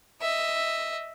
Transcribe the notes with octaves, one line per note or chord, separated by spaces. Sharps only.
D#5 E5